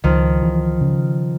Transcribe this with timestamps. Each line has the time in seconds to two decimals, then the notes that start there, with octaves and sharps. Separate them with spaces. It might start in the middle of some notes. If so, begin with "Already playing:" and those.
0.04 C#2 D#3 F3
0.43 E3
0.81 C#3